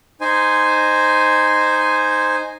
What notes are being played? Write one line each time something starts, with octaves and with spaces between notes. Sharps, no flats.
D#4 C5 G#5